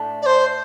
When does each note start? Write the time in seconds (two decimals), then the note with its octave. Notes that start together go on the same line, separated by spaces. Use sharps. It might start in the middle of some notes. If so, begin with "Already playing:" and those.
Already playing: A2 A3 D4
0.22 D5
0.26 C5